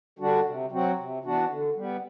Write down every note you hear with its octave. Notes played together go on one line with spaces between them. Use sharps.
D3 G3 D4 F#4
C3
F#3 C4 F#4
C3
E3 B3 D4 F#4
D3
G3 B3